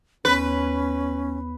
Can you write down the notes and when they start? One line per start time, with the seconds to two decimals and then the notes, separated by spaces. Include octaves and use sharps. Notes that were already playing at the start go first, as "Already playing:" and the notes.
0.25 D#2 B3 C#4 B4 C#5 B5